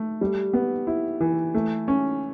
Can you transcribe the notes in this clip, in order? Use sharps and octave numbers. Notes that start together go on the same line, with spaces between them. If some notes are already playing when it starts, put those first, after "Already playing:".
Already playing: A3
G3
B3
E4
E3
A3
C#4